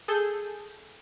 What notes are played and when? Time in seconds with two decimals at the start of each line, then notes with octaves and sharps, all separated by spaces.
0.08 G#4 A4 G6